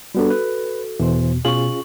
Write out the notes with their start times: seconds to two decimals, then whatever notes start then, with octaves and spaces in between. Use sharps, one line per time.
0.15 G3 B3 D4 F#4 A4
0.30 B4
0.99 E2 B2 E3 C5
1.45 B2 C#4 F4 G#4 C#6 F#7